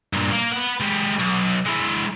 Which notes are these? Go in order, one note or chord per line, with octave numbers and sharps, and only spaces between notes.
G2 A#2
A#3
B4 F#5
G#3 G4
B1
G#3 E4